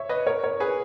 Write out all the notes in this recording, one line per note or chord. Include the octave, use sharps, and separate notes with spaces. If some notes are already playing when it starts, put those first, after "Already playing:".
Already playing: C#5 E5
B4 D#5
A#4 C#5
A#4 C#5
G#4 B4